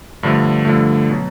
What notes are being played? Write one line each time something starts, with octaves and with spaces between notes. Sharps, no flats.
G2 D3 F3 A3
G2 D3 F3 A3
B2 F#3